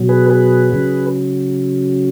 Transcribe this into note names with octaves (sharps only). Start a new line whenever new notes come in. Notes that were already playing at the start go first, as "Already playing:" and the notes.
Already playing: B2 F#3
G#4 B4
G#4 B4
C#3 F#3